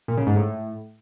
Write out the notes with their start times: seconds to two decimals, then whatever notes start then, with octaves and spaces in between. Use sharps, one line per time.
0.08 A#2
0.18 C#3
0.27 G#2
0.36 A2